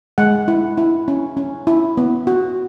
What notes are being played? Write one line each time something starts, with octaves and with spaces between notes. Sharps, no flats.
G#3 F#5
E4
E4
C#4
C#4
E4
B3
F#4